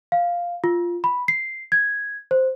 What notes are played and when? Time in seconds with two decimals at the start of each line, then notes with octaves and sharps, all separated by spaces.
0.12 F5
0.64 F4
1.04 B5
1.28 C7
1.72 G#6
2.31 C5